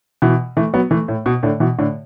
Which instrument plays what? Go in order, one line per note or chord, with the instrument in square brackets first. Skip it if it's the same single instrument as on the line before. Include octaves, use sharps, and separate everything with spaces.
[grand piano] B2 E3
E3 A3
F#3 B3
E3 A3
A2
B2
A2 D3
B2 E3
A2 D3